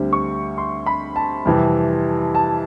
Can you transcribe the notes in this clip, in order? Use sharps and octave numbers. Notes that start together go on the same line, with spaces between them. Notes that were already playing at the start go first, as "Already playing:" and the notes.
Already playing: D2 D3 G3 C4
C#6
C6
B5
A5
F2 C3 E3 G3
A5